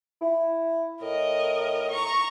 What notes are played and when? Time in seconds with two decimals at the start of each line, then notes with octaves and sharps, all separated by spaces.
0.22 E4
1.02 A2 A#4 D#5
1.91 A#5 C#6